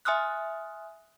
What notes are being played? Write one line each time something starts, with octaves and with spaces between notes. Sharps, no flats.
E5 G#5 C6 D#6 F6 F#6